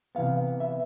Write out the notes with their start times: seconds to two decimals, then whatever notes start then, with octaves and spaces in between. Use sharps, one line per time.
0.15 C3 E3 B3 F5
0.60 E5